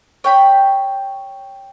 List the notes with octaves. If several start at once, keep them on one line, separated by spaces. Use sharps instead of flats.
C#5 G5 B5